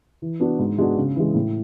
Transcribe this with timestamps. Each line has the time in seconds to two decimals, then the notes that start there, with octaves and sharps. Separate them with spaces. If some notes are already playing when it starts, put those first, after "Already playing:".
0.22 E3
0.40 B3 D4 F#4
0.59 G#2
0.78 G#3 B3 D4 F#4
0.97 C#3
1.16 E3 G#3
1.35 A2